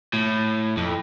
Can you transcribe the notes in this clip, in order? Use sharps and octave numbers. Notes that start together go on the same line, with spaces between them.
A2
F2